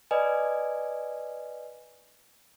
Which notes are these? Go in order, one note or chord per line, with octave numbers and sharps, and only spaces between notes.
B4 D5 D#5 G#5